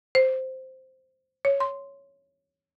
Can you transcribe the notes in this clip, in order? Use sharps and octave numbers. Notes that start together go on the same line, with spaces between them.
C5
C#5
C6